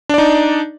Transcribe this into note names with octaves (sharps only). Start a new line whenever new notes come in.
D4 D#4 D5